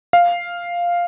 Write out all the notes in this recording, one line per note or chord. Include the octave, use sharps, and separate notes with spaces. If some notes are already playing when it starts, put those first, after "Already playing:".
F5